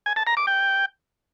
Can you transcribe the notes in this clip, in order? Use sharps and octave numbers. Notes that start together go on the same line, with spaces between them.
G#5
A5
A#5
D6
G5